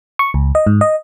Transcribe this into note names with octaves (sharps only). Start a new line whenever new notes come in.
C#6
C#2
D#5
G#2
D#5